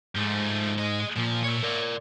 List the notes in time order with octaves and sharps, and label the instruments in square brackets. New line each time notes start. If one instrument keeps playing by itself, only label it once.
[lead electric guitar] G#2 [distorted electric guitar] F3 A3
[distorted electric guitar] G#3 D#5
[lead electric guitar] A#2 [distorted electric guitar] F3
[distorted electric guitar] C#5 E5
[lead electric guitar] A#4 D5